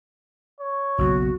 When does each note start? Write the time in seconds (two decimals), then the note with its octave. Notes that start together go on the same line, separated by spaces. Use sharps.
0.60 C#5
0.98 F#1 B1 F#2 F#4